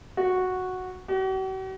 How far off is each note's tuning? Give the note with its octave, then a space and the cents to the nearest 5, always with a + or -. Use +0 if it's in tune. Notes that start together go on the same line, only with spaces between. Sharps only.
F#4 -5
F#4 +45